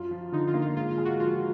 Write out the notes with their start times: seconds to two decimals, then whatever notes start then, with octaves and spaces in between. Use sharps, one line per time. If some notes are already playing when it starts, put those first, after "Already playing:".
Already playing: F#2 F4
0.11 F3
0.32 D3 D#4
0.47 F4
0.54 A#3
0.62 F4
0.76 G#2 F4
0.91 F4
0.98 G#3
1.05 F#4
1.19 F3 F4